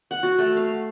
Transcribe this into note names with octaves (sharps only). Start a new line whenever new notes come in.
F#5
F#4
A3
F5